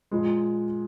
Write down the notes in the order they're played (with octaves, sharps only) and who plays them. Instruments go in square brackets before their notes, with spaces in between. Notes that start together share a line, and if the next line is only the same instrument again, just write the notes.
[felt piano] A#2 F3 G#3